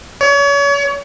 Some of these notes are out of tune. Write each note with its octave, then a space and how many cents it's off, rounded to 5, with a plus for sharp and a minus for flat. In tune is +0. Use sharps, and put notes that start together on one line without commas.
C#5 +35